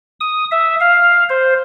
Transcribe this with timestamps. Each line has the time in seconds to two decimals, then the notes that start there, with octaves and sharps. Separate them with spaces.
0.20 D#6
0.51 E5
0.81 F5
1.29 C5